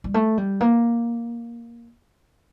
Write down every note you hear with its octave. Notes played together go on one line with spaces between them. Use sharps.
G3
A3
G3
A#3